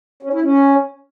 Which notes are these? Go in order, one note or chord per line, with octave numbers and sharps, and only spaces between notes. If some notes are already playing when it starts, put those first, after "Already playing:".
C#4
E4
C#4